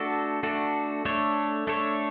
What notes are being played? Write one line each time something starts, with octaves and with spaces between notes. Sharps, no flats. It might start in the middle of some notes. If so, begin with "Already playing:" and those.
Already playing: A3 D4 F#4 A4
A3 D4 F#4 A4
A3 D4 A4 C#5
A3 D4 A4 C#5